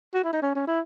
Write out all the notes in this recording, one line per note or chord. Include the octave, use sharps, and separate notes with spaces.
F#4
E4
D#4
C#4
C#4
E4